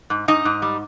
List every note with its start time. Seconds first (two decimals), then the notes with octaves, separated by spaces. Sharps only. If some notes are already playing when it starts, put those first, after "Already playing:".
0.10 G#2
0.28 G#2 D#4 D#5
0.45 G#2
0.62 G3